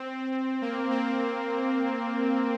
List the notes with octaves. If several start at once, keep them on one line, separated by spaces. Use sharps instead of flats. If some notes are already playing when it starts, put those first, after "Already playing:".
Already playing: C4
A#3
C4